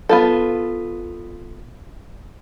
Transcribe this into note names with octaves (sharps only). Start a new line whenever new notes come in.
B3 F4 A4